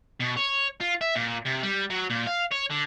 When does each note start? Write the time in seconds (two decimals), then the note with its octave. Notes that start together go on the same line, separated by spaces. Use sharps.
0.20 B2
0.37 C#5
0.81 F4
1.01 E5
1.15 A#2
1.46 C3
1.63 G3
1.90 F#3
2.10 A#2
2.27 F5
2.51 C#5
2.70 D3